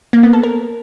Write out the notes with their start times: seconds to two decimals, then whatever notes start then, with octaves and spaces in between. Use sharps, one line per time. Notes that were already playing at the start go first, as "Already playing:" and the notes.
0.13 A#3
0.23 B3
0.33 A4
0.43 A#4